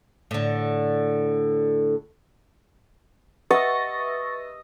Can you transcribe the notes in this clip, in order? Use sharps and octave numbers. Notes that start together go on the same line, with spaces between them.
A2 D3
B4 D#5 E5 F#5 C#6 E6 A6 A#6